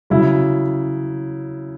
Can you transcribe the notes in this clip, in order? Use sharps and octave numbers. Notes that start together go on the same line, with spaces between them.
C#3 F#3 E4